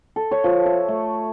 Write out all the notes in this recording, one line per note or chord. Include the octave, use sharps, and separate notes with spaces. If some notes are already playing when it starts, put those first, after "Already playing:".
A4
C#5
F3
E5
A3